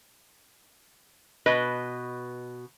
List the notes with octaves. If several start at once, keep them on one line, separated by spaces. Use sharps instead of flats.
B2 B4 D#5